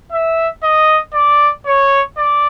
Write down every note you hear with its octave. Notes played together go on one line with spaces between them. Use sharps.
E5
D#5
D5
C#5
D5